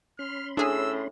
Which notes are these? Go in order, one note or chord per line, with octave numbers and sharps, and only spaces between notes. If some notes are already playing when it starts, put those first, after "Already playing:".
C#4 B5 C6 F6
A2 D4 G#4 G#5 E6